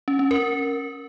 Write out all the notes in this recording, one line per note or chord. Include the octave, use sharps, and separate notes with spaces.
C#4
C#4
A#4